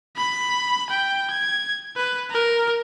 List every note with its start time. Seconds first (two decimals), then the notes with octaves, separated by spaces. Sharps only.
0.17 B5
0.90 G5
1.31 G#6
1.96 B4
2.31 A#4